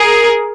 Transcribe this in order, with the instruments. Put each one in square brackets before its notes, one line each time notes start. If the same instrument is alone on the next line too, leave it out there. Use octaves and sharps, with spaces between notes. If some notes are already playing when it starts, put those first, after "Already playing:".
Already playing: [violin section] G#4 A#4